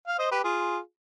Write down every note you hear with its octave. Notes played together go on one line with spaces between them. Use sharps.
F5
C5 D#5
G4 B4
F4 G#4